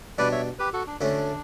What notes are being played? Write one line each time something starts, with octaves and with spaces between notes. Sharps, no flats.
B2 G3 D4 B4 D5
C#5 E5
G4 B4
F#4 A4
D4
D2 D3 A3 C#4 D4